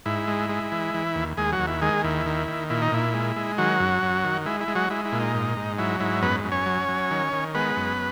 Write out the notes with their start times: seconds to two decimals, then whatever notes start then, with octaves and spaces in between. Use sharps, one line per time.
0.06 G#2 E4
0.28 G#3
0.49 G#3
0.72 E3
0.94 E3
1.16 D#2
1.37 D#2 G#3 G#4
1.53 F#3 F#4
1.59 D#2
1.67 E4
1.82 D#3 G#3 G#4
2.04 D#2 E4
2.26 D#3
2.48 D#3
2.70 A#2 E4
2.82 D#4
2.92 A#2 E4
3.14 G#3
3.36 G#3
3.58 D#3 F#3 F#4
3.80 F#2
4.03 F#2
4.24 D#3
4.46 G#3 E4
4.61 E4
4.68 G#3
4.75 F#3 F#4
4.90 G#3 E4
5.05 E4
5.12 A#2
5.20 D#4
5.35 G#2
5.57 G#2
5.78 F#3 E4
6.00 G#2 E4
6.22 F#2 B3 B4
6.44 F#2
6.52 C#4 C#5
6.66 F#3
6.89 F#3
7.11 D#3
7.33 D#3
7.55 G#3 B3 B4
7.77 F#2